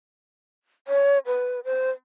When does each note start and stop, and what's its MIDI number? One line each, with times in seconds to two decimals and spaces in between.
0.88 1.19 73
1.26 1.60 71
1.65 1.90 72